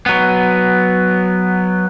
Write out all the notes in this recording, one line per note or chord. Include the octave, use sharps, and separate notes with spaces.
F#3 B3